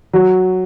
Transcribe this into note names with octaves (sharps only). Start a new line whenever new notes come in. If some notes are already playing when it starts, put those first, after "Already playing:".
F#3